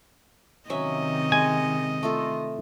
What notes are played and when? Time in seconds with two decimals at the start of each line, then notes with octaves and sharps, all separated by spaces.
0.70 C3 D#3 F#3 C#4 D#5 E5
1.32 G#3 G#5
2.03 A3 F4 A4